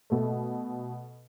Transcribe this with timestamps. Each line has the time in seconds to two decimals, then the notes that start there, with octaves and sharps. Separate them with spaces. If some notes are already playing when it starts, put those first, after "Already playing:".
0.10 B2 A3